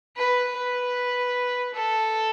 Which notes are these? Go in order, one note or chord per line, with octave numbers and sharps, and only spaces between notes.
B4
B4
A4